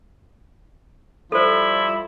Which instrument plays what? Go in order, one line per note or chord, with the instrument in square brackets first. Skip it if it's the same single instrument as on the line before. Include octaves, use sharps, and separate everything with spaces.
[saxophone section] F3 G3 E4 [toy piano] A4 C5